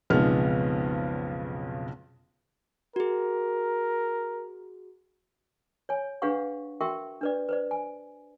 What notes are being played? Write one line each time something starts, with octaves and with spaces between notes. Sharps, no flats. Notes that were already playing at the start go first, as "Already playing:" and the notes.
B1 F2 C#3 G#3 B3 F6
F#4 G#4 A#4
C#5 G#5
D4 G#4 B4 F5 F#5 C#6
F#4 A#4 E5 G5 C#6
D4 B4 D5
B4 C5 D5
G#5